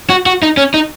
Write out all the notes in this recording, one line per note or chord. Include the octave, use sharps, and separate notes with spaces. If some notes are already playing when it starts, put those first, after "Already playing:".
F#4
F#4
D#4
C#4
D#4